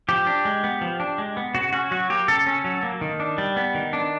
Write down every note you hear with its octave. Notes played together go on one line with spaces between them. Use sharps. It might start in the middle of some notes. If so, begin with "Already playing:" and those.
F3 G4
D4
G#3
B3
F3
D4
G#3
B3
C#3 F#4
C#4 F#4
F#3 F#4
A#3 G4
C#3 A4
C#4
F#3
A#3
D#3
D4
G3
B3
D#3
D4